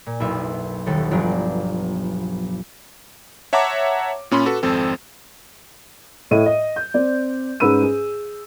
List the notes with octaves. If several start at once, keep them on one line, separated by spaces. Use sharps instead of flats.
A#2
F#1 B1 B3 E5
D#1 D#2 A4
G1 F3 F#3 D4
C#5 E5 F#5 A5 A#5 D6
A#2 C#4 B5 C6
F#4 A4 B4
G#1 F2 C4 A4
A2 D#5 D#7
D#5
G6
C4 D5
G#2 C#4 B4 B5 E6 D#7
G#4